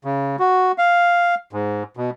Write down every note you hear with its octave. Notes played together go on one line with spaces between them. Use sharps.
C#3
F#4
F5
G#2
B2